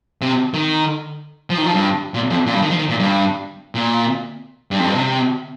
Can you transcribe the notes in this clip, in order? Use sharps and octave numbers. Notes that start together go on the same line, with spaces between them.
C3
D#3
F3
D#3
F3
G2
A#2
F2
A#2
G2
D#3
F3
D#3
A#2
G2
A#2
G2
F2
G2
C3